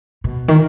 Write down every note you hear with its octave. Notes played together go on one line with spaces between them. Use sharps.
B2
D#3